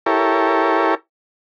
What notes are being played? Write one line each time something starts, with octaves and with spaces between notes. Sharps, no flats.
E4 G4 A4 A#4 C#5